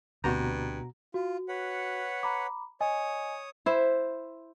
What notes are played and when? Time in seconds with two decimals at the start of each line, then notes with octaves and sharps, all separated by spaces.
0.24 D2 G2 B2 C4 F#4 A#5
1.14 F4 F#4
1.49 B4 C#5 F#5
2.23 A#5 B5 D6
2.81 C#5 D#5 G#5 D#6
3.66 E4 C5 E5